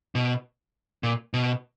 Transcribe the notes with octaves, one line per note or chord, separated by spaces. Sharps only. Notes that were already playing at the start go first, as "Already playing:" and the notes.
B2
A#2
B2